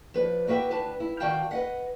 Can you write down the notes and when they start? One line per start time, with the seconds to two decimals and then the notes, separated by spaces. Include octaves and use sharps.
0.14 F3 B4 D5
0.47 A#3 F#4 B4 E5 G5
0.70 D2 D4 B4 A5
1.00 E4
1.20 D#3 F#4 D5 F5 G5 A5
1.51 B4 D#5 F#5